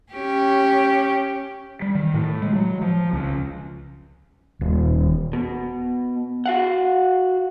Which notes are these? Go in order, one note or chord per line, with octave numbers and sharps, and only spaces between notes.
C#4 G4
G3
D#3
A2
G#3
F#3
F3
C#2
D#1
B2
F#4 F5 F#5